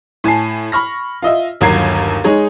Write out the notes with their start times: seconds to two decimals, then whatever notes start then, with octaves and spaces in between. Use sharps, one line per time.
0.24 A2 G#5 A5 C7
0.72 B5 C#6 F6 A#6
1.22 F4 D#5 E5
1.61 G1 D#2 F#3 A#4 G#6 C7
2.24 G#3 D#4 G#4 C#5